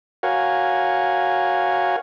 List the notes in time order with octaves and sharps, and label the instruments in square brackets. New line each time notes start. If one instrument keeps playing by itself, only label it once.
[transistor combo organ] F#4 A#4 C#5 F5 F#5 G#5